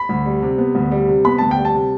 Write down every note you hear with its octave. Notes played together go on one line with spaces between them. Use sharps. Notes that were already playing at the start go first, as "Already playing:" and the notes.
Already playing: B5
D2
G3
C3
B3
D2
G3
C3
B3 B5
D2 A5
G5
G3
A5
C3